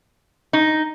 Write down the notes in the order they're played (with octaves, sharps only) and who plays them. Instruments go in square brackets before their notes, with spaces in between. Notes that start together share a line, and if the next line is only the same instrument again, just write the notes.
[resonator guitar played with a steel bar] D#4